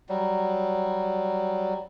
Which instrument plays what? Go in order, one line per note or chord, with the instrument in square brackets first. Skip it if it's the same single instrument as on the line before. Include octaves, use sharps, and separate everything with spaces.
[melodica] F#3 G3